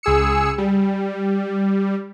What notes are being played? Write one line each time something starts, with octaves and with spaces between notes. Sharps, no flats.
C#2 G#4 E6 C#7
G3